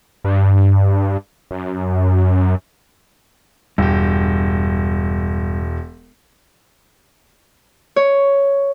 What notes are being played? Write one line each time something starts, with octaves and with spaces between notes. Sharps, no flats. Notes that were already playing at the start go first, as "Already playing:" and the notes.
G2
F#2
E1 G2 G4
C#5